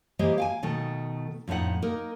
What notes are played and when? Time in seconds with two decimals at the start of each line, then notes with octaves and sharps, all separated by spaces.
0.19 E3 G#3 A#3 G4 C5 D#5
0.38 F5 G5 G#5
0.63 B2 D#3 A3
1.48 F2 A2 D4 D#4 F#5
1.82 A#3 D#4 A#4